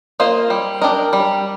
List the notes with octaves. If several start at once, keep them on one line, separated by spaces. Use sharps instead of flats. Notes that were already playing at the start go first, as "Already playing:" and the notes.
A#3 F4 C5 D#5
G3
D4 G4 A#4 D#5
G3